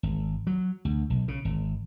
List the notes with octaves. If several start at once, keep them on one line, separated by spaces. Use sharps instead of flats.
G#1
F#3
D2
B1
C#3
G#1